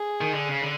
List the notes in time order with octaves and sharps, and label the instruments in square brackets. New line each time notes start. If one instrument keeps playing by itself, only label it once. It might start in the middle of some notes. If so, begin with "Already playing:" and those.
Already playing: [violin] G#4
[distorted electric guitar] D#3
D3
C#3
D3